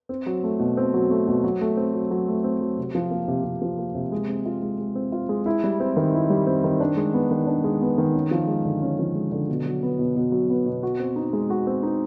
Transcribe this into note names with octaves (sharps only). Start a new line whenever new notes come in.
C4
F#3
A3
B2
C4
F#3
A3
B2
F#3
A3
C4
F#3
F#3
A3
C4
F#3
C3
F3
A#3
C3
C3
F3
A#3
C3
G#3
C4
F4
G#3
G#3
C4
F4
G#3
E4
G3
C4
D#3
E4
G3
C4
D#3
D4
G#3
B3
D#3
D4
G#3
B3
D#3
C#4
F3
G#3
D3
C#4
F3
G#3
D3
B2
F#3
B3
B2
B2
F#3
B3
B2
F#4
C4
D#4
G#3
F#4
C4
D#4